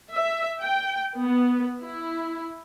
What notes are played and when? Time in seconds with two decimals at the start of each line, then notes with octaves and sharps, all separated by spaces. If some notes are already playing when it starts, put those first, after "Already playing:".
0.12 E5
0.60 G5
1.19 B3
1.80 E4